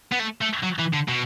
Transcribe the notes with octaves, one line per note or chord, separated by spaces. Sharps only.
B3
A3
A3
F#3
E3
D3
B2